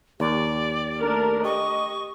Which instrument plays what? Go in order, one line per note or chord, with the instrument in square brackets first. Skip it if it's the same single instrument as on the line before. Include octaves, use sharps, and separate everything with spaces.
[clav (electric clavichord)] D#2 [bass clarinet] G4 [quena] D5
[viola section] A3 D4 A#4
[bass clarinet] G4 [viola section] D#5 [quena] C#6